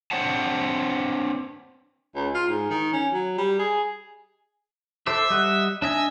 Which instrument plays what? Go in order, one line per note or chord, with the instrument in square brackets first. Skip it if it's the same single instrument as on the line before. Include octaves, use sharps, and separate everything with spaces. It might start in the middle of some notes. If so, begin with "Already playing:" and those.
[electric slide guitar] C4 D4 C5 C#5 F#5 A5
[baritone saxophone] C#2
F4
G#2
D#3
C#4
F#3
G3
G#4
[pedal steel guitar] A4 C5 D6 [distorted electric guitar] E5
[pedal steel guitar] G3 D#5 F#5
[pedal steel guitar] D4 D#5 G#5 [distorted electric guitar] E5